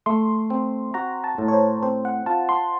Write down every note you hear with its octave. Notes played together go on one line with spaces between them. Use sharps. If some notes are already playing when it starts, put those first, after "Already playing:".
A3 C6
C4
F#4 A#5
A5
A2
C#5
C5
C4 C5
F#5
F4 A5
C6